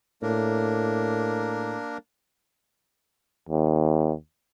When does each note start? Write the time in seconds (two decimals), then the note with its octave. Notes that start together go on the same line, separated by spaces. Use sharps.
0.22 A2 A#3 D4 A#4
3.49 D#2